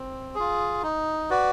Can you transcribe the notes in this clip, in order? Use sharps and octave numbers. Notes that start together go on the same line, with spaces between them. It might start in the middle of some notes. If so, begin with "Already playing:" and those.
Already playing: C4
F4 G#4
D#4
F#4 B4 D5